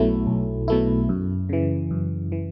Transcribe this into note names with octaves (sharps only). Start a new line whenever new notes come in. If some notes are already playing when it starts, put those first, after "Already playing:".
Already playing: B1 B2 F#3 A3 E4
B1
B2 F#3 A3 E4
F#2
C#3 E3
F#2
E3